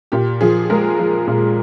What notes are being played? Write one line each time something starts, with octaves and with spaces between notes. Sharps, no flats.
A#2 G4
F3 G#4
G#3 A#4
F3
A#2